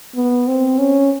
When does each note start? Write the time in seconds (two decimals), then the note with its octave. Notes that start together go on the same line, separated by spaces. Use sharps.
0.15 B3
0.48 C4
0.78 C#4